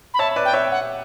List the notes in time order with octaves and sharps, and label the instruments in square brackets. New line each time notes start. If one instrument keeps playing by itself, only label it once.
[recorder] B5
[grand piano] C#5 E5 [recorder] A5
[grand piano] B4 D5
[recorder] G5
[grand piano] C#5 E5
[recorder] F#5